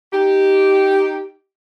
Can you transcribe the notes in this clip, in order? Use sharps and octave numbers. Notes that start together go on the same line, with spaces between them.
D#4 G4